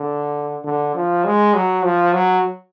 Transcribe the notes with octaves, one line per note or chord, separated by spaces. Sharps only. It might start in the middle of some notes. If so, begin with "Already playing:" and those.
Already playing: D3
D3
F3
G#3
F#3
F3
F#3